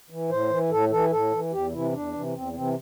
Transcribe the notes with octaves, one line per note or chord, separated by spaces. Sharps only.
E3
A2 C5
E3
A2 A4
E3 A4
A2 A4
E3
E2 G4
C3 E3 E4
E2 D4
C3 E3
E2 C4
C3 E3 C4